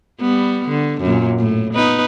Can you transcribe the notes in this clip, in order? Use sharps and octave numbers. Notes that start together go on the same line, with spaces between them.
G3 B3
D3
F#2 A#2
A2
B3 D#4 B4